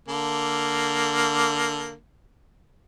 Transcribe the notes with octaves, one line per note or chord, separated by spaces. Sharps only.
D3 A#3